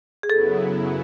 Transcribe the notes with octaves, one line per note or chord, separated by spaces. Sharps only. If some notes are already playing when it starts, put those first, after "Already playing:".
G#4
F#2 C#3 F#3 B3 E4 A4